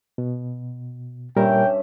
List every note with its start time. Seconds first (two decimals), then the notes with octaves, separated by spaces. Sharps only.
0.18 B2
1.36 G2 A#2 G3 C#4 A#4 E5 G5